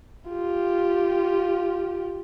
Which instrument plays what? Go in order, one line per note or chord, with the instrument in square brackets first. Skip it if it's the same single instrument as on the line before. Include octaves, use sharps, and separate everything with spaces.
[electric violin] F4 G4